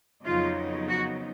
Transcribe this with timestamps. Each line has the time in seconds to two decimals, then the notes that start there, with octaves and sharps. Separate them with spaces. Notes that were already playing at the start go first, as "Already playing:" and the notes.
0.25 F2 C#3 F#3 B3 D#4 F4
0.88 F#4